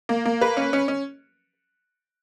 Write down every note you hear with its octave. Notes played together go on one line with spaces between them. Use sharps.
A#3
A#3
B4
C#4
C#4
C#4